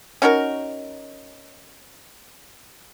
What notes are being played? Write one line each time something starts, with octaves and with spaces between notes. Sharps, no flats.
C#4 D#4 F#4 A#4